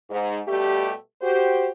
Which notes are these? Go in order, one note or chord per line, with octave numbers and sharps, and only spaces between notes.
G#2
B2 G3 A3 G4
F#4 G4 C5